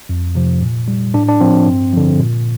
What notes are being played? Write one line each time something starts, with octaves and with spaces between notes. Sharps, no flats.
F2
C3 F3
A#2
G3
A2 D4
D4
F3 C4
G2
D3 F3
A#2